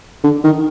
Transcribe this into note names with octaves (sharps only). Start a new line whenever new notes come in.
D3
D#3